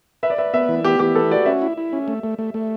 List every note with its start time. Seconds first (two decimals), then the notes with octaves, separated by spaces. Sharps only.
0.23 B4 E5
0.30 D5
0.38 B4 E5
0.54 B3 E5
0.69 E3
0.84 B3 G4
0.99 E3 G4
1.15 A4 B4
1.31 F#4 D5
1.46 C#4 E5
1.62 E4
1.77 E4
1.93 C#4
2.08 A3
2.23 A3
2.39 A3
2.54 A3